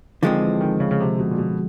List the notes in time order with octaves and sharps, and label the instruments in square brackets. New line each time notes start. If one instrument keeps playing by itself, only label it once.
[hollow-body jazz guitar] D3 F3 G#3 C4 [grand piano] D#3
[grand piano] E3
D#3
C#3
C#3
C3
B2
A#2
B2